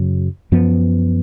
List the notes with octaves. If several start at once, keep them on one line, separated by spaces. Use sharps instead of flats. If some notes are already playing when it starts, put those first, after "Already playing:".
Already playing: F#2 C#3 F#3
F#2 F3 B3